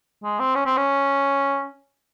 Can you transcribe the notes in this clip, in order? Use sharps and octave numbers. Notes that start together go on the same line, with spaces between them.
G#3
C4
C#4
C4
C#4